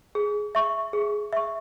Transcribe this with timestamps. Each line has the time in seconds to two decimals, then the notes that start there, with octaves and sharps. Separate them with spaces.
0.15 G#4
0.55 E5 C#6
0.93 G#4
1.33 E5 C#6